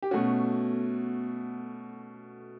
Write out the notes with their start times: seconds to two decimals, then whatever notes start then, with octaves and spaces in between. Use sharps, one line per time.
0.02 G4
0.11 B2 A3 C#4 F#4